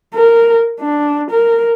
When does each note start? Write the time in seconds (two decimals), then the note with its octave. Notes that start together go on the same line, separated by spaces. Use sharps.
0.15 A#4
0.80 D4
1.31 A#4